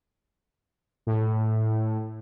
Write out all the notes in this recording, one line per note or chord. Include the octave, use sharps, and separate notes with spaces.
A2